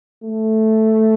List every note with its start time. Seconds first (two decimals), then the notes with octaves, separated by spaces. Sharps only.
0.24 A3